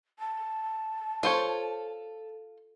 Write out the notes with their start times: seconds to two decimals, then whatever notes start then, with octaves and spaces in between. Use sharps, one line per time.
0.19 A5
1.23 F4 A4 C5 C#5